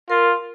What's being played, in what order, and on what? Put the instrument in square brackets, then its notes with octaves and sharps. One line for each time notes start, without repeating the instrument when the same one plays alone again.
[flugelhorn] F4 [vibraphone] A#4